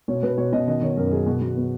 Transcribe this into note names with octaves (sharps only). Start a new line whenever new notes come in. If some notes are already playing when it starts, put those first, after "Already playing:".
B2 C#5
B2 B4
B2 C#5
B2 D#5
D#3 D#5
D#3 C#5
F#2 A#4
F#3 G#4
B2 F#4
B2
B3